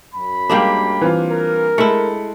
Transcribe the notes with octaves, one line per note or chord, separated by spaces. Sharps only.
F#2 B5
G3 G#3 A#3 D4 F5 G5
E3 C4 F4
A#4
G#3 A3 E4 C#7